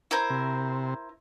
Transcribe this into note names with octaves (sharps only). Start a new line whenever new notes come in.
E4 A#4 C5
C3